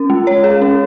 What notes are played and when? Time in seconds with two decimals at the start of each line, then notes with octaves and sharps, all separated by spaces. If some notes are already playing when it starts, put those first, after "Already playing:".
Already playing: C#4
0.10 G#3
0.27 C#5
0.44 G#4
0.62 C#4